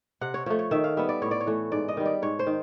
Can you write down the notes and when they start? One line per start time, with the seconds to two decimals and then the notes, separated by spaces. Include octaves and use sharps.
0.21 C3 F#5
0.34 C#5
0.46 F3 A3 C#5
0.59 C#5
0.71 D#3 E5
0.84 F5
0.97 G3 B3 E5
1.09 D5
1.22 A2 C#5
1.31 D5
1.41 C#5
1.47 E3 A3
1.72 G#2 D5
1.88 D#5
1.97 D#3 G3
2.06 D5
2.22 G#2 C#5
2.39 C5
2.47 D#3